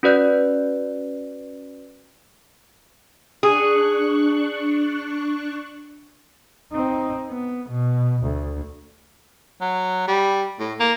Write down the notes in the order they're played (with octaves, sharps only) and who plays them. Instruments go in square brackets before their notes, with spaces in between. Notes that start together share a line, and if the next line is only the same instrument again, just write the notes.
[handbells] C#4 F#4 B4 D5 F#6 G6
[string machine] D4 C#6 F#6 [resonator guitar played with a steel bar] G#4
[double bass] C4 D#4
B3
B2
D2
[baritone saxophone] F#3
G3
A2
A#3